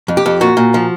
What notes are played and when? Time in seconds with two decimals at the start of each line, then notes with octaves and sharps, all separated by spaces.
0.08 F2
0.17 G4
0.26 F2
0.41 A#2 F#4
0.57 A#2
0.74 F3